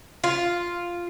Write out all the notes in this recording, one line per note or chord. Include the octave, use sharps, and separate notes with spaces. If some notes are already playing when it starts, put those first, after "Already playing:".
F4